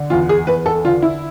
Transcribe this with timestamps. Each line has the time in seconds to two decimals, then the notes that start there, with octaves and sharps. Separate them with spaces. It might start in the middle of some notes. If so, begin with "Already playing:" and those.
Already playing: D3
0.10 E2 F4
0.29 G#4
0.47 E2 B4
0.66 A4
0.84 D3 F4
1.02 E4